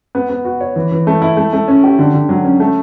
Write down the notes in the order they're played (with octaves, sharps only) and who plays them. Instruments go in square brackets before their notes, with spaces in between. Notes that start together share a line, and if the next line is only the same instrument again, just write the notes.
[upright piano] B3
B3
F#4
C#5
E3
E3
A3
E4
A3
A3
C#4
G4
D3
D3
F#3
C#4
A3